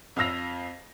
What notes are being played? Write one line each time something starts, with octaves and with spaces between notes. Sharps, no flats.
F2 F4 F5 E6 A#6 F7